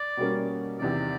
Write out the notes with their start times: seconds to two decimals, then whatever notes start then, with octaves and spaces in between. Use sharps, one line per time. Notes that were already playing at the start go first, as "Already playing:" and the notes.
Already playing: D5
0.17 B2 G3 A#3 C#4
0.79 E2 C3 D#3 D5